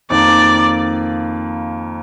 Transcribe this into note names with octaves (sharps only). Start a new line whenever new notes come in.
F2 D#3 A#3 D5